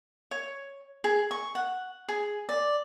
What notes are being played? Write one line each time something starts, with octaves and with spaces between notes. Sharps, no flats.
C#5
G#4
C#6
F#5
G#4
D5